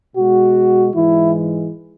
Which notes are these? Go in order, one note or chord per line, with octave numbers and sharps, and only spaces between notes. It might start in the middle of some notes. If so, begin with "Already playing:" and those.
B2 G#3 F#4
G#2 E3 G#3 E4